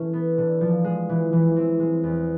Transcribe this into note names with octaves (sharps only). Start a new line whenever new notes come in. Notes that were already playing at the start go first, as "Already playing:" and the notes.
Already playing: E3 A3 C#4
B3
D3
F3
G#3
E3
E3
C4
G#3
E2